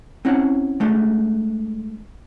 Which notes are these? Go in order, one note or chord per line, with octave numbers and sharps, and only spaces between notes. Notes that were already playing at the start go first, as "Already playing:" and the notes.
C4 C#4 E4 F#5
G#3 A3 D4